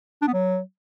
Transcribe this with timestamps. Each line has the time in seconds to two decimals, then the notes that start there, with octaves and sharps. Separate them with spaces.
0.22 D4
0.28 B3
0.33 F#3